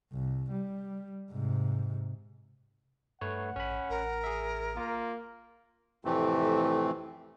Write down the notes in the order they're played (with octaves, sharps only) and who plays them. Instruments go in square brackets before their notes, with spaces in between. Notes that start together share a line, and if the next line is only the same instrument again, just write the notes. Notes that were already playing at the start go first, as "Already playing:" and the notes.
[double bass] C2
G3
G#2 C3
[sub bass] G2 [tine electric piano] A3 B4 C#5 [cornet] F#5
[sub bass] A1 [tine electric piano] C#4 B5
[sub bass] A1 [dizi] A#4
[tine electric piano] G#4 E5
[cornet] A#3 [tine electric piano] F4
[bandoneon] F2 A2 C3 E3 A3 C4